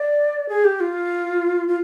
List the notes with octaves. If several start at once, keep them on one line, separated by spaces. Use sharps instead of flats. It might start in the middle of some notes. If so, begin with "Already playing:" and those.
Already playing: D5
G#4
G4
F4
F4